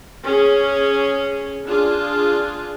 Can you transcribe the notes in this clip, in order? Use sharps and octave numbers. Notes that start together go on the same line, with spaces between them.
C#4 G#4
D4 F4 G#4